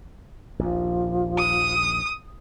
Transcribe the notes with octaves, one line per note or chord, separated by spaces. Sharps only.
A#1 D#2 F3
D#6